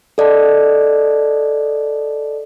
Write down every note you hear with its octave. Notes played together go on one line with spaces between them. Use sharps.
A4 D5 D#5 A5